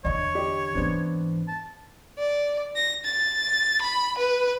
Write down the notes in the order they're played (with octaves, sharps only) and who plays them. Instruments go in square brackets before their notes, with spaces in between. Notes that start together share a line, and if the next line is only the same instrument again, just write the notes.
[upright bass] E2 D3 [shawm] C#5 [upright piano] D#5
[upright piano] G4 D#5
[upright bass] G#2 E3 [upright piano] B3 C4 D4
[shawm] A5
[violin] D5
A#6
A6
B5
B4